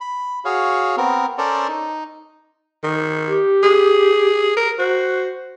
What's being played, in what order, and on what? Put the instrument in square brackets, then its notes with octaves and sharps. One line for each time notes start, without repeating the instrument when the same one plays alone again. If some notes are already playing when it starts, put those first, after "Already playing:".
[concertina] B5
F#4 G#4 C#5 F5
B3 C4 A#4
C#4 A4 A#4 C5 D5
D#4
[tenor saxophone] D#3
[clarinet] G4
[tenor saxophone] G#4
A#4
[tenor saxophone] F#4 [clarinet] C5